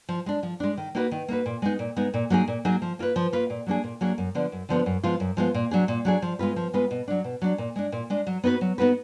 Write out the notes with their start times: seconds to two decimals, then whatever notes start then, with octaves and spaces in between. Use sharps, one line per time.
0.09 F3
0.26 G#3 D4
0.43 F3
0.60 G#3 D4
0.77 D#3
0.95 A#3 D#4 F#4 B4
1.11 D#3
1.28 A#3 D#4 F#4 B4
1.46 A#2
1.62 G#3 B3 D#4
1.79 A#2
1.96 G#3 B3 D#4
2.14 A#2
2.30 F#3 A#3 D#4 G#4
2.48 A#2
2.65 F#3 A#3 D#4 G#4
2.82 F3
2.99 A#3 F4 B4
3.16 F3
3.33 A#3 F4 B4
3.50 A#2
3.67 F#3 A#3 D4 G#4
3.84 A#2
4.01 F#3 A#3 D4 G#4
4.18 F#2
4.35 D3 F3 B3 D4
4.52 F#2
4.69 D3 F3 B3 D4
4.86 F#2
5.03 F3 G#3 B3 F4
5.20 F#2
5.37 F3 G#3 B3 F4
5.54 A#2
5.71 F#3 D4 G#4
5.88 A#2
6.05 F#3 D4 G#4
6.22 F3
6.39 G#3 B3 F4 B4
6.56 F3
6.73 G#3 B3 F4 B4
6.91 B2
7.08 F#3 D4
7.24 B2
7.42 F#3 D4
7.58 A#2
7.76 G#3 D4
7.92 A#2
8.10 G#3 D4
8.27 F#3
8.44 B3 D#4 F#4 B4
8.61 F#3
8.78 B3 D#4 F#4 B4